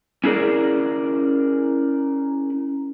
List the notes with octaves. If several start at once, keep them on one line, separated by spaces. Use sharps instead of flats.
C#4 E4 G#4 A#4 D5